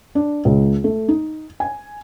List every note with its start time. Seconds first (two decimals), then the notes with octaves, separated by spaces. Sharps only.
0.15 D4
0.45 C#2
0.84 A3
1.08 D#4
1.60 G#5